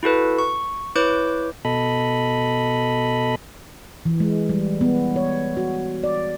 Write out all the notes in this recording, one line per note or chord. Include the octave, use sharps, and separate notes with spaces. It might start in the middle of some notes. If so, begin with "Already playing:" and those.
E4 F#4 A4 B4
C#6
E4 B4 C#5 D6 G6
B2 A4 D#5 B5
E3
G#3
G3
B3
C#5
F#4
D5